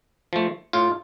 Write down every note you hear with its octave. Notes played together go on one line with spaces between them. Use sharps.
F3 A3
A2 F4